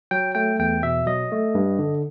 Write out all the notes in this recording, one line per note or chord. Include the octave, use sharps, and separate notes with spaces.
F#3 G5
A3 G5
E2 G5
B2 E5
F#3 D#5
A3
G2
D3